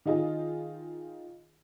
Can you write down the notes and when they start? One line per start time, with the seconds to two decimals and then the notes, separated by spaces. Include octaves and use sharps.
0.06 D#3 D#4 F4 G#4 D#5